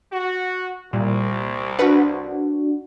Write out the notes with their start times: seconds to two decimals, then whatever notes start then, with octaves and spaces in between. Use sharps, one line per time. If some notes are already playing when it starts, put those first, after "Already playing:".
0.12 F#4
0.93 C2 A#2 G3
1.79 D4 F#4 B4 F5 F#5